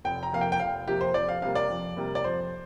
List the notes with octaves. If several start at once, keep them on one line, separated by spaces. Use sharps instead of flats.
F1 G5
A#5
F2 C3 A#3 F5
G5
G5
F1 F5
F2 C3 A#3 G4
C5
F2 D5
F5
C3 G3 A#3 F5
D5
F2
C3 G3 A#3
D5
F2 C5